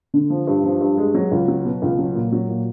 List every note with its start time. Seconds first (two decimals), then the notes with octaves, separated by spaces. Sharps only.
0.14 D3
0.30 F3
0.47 G2
0.64 F3
0.81 G2
0.98 G#3
1.15 F#3
1.31 C#2
1.48 F#3
1.65 B2
1.82 C#2
1.99 F#3
2.15 A#2
2.32 F#3
2.49 A#2